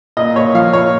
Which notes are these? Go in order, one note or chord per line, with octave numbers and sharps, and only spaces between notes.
A#2 D#5
A#2 C#5
F3 F5
A#2 C#5